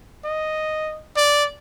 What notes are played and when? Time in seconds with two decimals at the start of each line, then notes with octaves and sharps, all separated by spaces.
0.25 D#5
1.17 D5